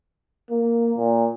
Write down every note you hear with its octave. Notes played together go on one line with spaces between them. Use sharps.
A#3
A#2